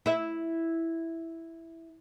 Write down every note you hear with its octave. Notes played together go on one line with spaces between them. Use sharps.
E4 E5